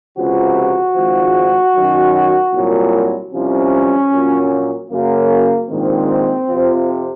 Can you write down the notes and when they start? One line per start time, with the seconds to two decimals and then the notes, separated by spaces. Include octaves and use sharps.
0.17 C#2 C3 F3 F#4
0.95 G#1 G#2 F3
1.75 F#2 D#3 F#3
2.53 C2 A#2 F#3
3.33 C2 C3 F3 C#4
4.12 A#1 A#2 F#3
4.91 F#2 C#3 F#3 A#3
5.70 A#1 G#2 D#3 C4
6.49 F2 C3 F3